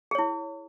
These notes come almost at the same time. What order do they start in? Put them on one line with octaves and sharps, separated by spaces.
G#4 C#5 E4